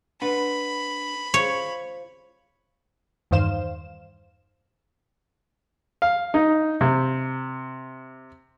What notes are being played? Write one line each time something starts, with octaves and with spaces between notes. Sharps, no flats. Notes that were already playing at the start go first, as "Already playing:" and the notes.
D4 B4 F#5 B5 C6
F4 C5 C#5 F5
E2 G2 D#3 C5 F5 E7
F5
D#4
C3